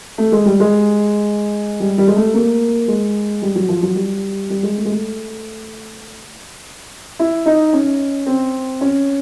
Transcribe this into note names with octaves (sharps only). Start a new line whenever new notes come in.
A3
G#3
G3
G#3
G3
G3
G#3
A3
A#3
G#3
G3
F#3
F3
F#3
G3
G3
G#3
A3
G#3
A3
E4
D#4
C#4
C4
C#4